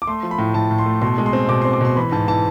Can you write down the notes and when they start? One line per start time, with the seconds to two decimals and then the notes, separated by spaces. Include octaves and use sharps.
0.02 D6
0.07 A3 C6
0.23 F3
0.31 B5
0.38 A2
0.54 A2 A5
0.71 A2
0.78 C6
0.86 A3
1.01 B2 C6
1.18 G#3
1.26 C6
1.33 C4
1.49 B2 D6
1.62 C6
1.65 C4
1.73 D6
1.81 B2 C6
1.96 E3 B5
2.12 G#2 A5
2.28 E3 A5